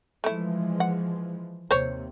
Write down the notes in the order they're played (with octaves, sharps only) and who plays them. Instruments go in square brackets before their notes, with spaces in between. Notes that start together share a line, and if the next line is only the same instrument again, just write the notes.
[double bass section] E3 F3 G#3 [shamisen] A3 E4
[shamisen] F#5
[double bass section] D#2 C3 [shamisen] C5 C#5